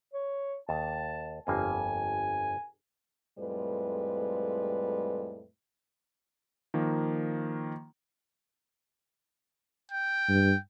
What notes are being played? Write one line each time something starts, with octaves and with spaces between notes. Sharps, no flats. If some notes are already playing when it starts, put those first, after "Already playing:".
C#5
D#2 A5
G1 F2 A#3 G#5
F2 A2 G3 G#3 B4
D#3 F3 A#3
G5
G2